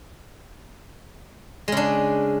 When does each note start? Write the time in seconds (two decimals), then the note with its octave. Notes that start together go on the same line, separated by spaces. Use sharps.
1.68 G#3
1.72 C#3
1.77 D4